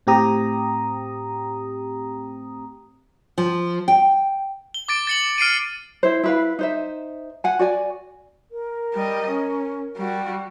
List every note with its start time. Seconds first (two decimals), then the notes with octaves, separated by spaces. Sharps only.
0.07 A2 C4 G4 A#5 D#6
3.38 F3
3.88 G5
4.74 G7
4.88 D6 A6 D7
5.07 A6 C#7 F#7
5.38 F6 C7 D7 D#7
6.03 E4 C5
6.23 E4 B4 F5
6.59 D#4 C5 E5
7.44 F#5 G#5
7.59 F#4 D5 G#5
8.51 A#4
8.94 G3 D#5
9.29 C#4
9.97 G3 F#4